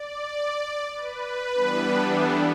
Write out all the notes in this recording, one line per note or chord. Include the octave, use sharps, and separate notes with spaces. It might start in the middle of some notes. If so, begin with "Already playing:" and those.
Already playing: D5
B4
E3 G3 B3 D4
A4